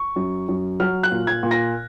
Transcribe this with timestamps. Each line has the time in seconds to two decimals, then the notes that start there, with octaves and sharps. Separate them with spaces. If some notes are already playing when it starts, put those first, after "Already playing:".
Already playing: C#6
0.16 F#2
0.49 F#2
0.80 F#3 F6
1.03 F#6
1.12 A#2
1.27 G#6
1.43 A#2
1.51 A#6